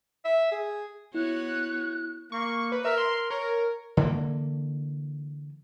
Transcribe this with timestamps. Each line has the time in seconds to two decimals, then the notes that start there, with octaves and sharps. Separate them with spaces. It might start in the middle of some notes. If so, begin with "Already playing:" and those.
0.25 E5
0.52 G#4
1.14 B3 E4 F#4 C#5 F#6
2.32 A#3 C#6
2.72 B4
2.85 A#4 E5
2.98 C6
3.31 A#4 C#5
3.97 D3 E3 A#3